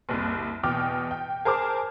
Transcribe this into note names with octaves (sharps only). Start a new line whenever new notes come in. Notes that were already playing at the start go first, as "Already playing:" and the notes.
F#1 C2
E2 B2 G5 D6 F6
G5
G#4 A#4 C5 A5 D6 F6